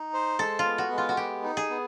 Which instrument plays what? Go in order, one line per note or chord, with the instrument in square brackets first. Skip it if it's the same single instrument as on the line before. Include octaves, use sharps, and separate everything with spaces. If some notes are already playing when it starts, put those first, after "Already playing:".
Already playing: [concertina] D#4
C5
[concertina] G#3 [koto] A4
[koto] F4
[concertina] B3
[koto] F#4
[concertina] G#3
[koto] F4
F#4
[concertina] B3 [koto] G4
[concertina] D#4
[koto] G#4
[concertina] B3